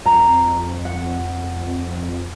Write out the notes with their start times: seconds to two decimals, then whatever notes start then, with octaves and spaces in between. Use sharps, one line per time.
0.05 F2 A#5
0.85 F#5